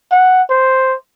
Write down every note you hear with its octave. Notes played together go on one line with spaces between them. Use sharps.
F#5
C5